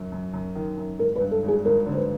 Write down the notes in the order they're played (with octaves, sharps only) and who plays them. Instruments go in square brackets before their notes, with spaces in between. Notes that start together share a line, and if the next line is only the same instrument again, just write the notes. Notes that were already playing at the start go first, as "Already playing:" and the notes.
Already playing: [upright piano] F#2 F#3
F#2
F#2
D#3
F#2
[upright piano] G#1 [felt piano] A#4
[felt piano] B4
[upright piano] G2
[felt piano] A4
[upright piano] G#1
[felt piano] G#4
[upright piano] G#1 [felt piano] A#4
[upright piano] D3
[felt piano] C5
B4